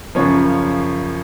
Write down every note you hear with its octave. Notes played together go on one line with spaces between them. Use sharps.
F#2 C#3 F3 C#5